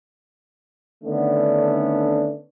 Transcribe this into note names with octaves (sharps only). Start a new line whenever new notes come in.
D3 D#3 A3 B3 C#4 D4